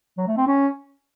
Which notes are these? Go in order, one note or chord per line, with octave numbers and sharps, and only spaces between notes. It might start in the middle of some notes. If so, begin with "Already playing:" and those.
F#3
A3
C4
C#4